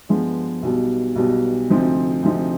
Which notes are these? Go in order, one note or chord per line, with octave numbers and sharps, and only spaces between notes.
G2 F3 G#3 B3
B1 B2 G3
B1 B2 G3
D2 C3 F3 C4 D#4
D2 C3 F3 C4 D#4